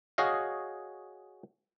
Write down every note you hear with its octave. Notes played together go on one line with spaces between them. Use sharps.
F#4 G#4 C#5 D#5 F5